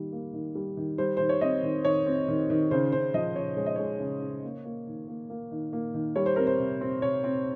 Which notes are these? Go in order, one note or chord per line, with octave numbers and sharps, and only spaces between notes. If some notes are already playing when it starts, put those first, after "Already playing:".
Already playing: D#3 G3 A#3
A#3
D#3
G3
D#3
G3 C5
D#3 C5
C#5
C4 D#5
D#3
D#3 C#5
C4
D#3
D#3
C#3 C5
C#3 C5
F3 D#5
C#3 C#5
G#3 C#5
D#5
G#3 C#5
C#3
C#3
A#3
A#3
D#3
A#3
A#3
D#3
A#3
D#3
G3 C#5
C5
C4 A#4
C5
C3
C4
C3 C#5
C4